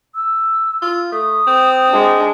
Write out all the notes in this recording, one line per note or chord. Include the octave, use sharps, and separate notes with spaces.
E6
F4
A3 D#6
C4
G#3 D4